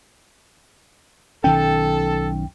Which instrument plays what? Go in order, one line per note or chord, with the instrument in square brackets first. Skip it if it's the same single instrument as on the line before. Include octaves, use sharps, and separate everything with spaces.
[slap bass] B1 D#3 C#4 [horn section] A4 [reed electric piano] G5